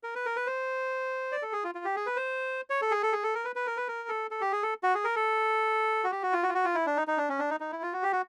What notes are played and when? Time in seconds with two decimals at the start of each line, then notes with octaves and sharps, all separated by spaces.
0.03 A#4
0.15 B4
0.26 A#4
0.36 B4
0.47 C5
1.32 D5
1.42 A4
1.53 G#4
1.64 F4
1.75 F4
1.85 G4
1.96 G#4
2.06 B4
2.16 C5
2.70 C#5
2.82 A4
2.91 G#4
3.03 A4
3.13 G#4
3.23 A4
3.35 A#4
3.45 B4
3.56 B4
3.67 A#4
3.77 B4
3.88 A#4
4.09 A4
4.31 A4
4.41 G4
4.52 G#4
4.63 A4
4.83 F#4
4.95 G#4
5.04 A#4
5.16 A4
6.04 F#4
6.12 G4
6.23 F#4
6.33 F4
6.43 F#4
6.49 F4
6.54 F#4
6.65 F4
6.75 E4
6.86 D4
6.97 D#4
7.08 D#4
7.18 D4
7.29 C#4
7.39 D4
7.50 D#4
7.60 D#4
7.72 E4
7.82 F4
7.93 F#4
8.03 G4
8.13 F#4